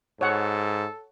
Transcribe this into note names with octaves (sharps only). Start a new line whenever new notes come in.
G#2 A4 C#5 F#5